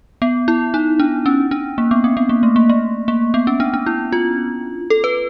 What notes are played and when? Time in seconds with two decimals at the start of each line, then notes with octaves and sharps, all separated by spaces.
0.22 B3
0.48 E4
0.74 D#4
1.00 D4
1.26 C#4
1.51 D4
1.78 A#3
1.91 B3
2.04 C4
2.17 B3
2.29 A#3
2.43 A3
2.56 A#3
2.69 A3
3.08 A#3
3.34 B3
3.47 C#4
3.60 D4
3.74 D4
3.86 E4
4.12 F4
4.90 A4
5.04 B4